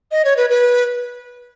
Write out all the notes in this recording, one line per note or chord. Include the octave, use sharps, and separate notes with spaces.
D#5
C#5
B4
B4